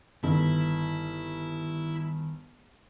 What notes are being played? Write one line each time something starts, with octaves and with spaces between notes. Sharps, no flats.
G1 D#3 E4